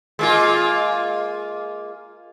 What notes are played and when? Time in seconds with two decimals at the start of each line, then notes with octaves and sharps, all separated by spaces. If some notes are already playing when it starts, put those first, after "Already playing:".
0.19 G#3 A#3 F4